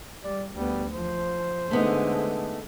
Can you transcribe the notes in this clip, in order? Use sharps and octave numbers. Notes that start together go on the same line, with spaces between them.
G3 D5
D2 G3 B3
F3 C5
D3 G#3 A3 B3 D#4